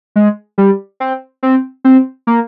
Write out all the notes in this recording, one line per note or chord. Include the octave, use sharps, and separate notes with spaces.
G#3
G3
C4
C4
C4
A#3